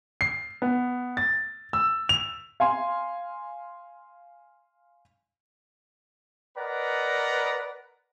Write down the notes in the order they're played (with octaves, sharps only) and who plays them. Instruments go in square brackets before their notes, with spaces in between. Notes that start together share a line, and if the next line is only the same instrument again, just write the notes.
[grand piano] C7
B3
A6
E6
F7
[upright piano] F5 G#5 C6
[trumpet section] A#4 B4 D5 D#5 F#5 A#5